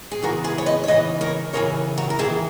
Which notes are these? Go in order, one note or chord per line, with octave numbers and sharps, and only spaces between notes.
G#4
E2 C#3 E3 F#4 A#4
G#4 B4
C#5
B4 D#5
C#5
E2 C#3 E3 B4 D#5
A#4 C#5
D#2 C#3 E3 A#4 C#5
F#4 A#4
A#4
D#2 C#3 E3 E4 G#4